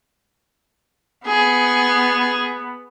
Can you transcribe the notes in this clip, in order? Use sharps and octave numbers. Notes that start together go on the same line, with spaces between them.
B3 G#4